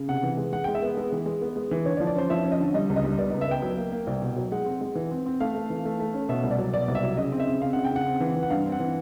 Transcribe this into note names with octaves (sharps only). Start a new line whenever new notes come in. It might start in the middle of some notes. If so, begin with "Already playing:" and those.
Already playing: C#3
C3 F#5
E3
G#3
G#3 F#5
G#3 G5
E5
B3
G#3
E3
G#3
B3
G#3
E3
D3 C#5
D5
F3
D5
C#4 C5
F3 E5
C#4
D#5
D3
G3 D#5
C#2
D#5
G3
B3 D5
C#2 D#5
E5
B3 G5
F#3
A#3
A#3
C2
B2
F#3
G#3 F#5
C4
G#3
E3
C4
C4
A3 F5
A3
E3
A3
A3
C#4
B2 E5
C2
D5
F#3
B2 D5
C2
E5
F#3
C#3 D#5
C4
E5
C#3
C4 F5
C#3 F#5
G5
C#3 F#5
C4
E3
E3
F#5
G2 F5
C4
F#5
E3